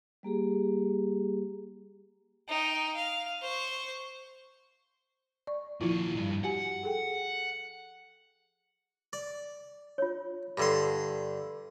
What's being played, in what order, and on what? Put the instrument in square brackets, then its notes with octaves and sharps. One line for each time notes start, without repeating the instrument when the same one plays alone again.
[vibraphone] G3 A#3 G4 G#4
[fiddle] D#4 G5
F5
C5 C#6
[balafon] D5 C#6
[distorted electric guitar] A#2 D#3 [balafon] F3 E4 F4
[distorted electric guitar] B1 G2
[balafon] F#4 G4 G#5 [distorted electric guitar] F#5
[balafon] G#4 A4 G5
[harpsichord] D5
[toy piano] F4 C#5
[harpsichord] G2 D3 C6